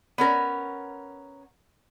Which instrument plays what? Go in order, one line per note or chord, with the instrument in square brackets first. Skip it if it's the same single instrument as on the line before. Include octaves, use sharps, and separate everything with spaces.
[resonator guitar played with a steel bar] B3 C#4 A#4